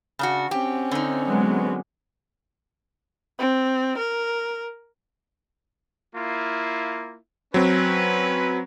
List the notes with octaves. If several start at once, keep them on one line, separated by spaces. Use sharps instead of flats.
C#3 D4 F#4
C4 C#4 G4
D3 D#4
F#3 G#3 B3
C4
A#4
A#3 E4 F4
F#3 C4 C#4 B4